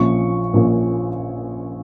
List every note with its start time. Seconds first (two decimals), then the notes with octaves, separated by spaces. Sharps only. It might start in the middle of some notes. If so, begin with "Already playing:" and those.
Already playing: A#1 A#2 F3 C#4 C#6
0.54 A#1 A#2 F3 C#4